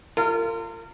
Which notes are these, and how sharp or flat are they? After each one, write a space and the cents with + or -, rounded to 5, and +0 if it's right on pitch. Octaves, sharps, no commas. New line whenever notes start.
F4 -20 A#4 -40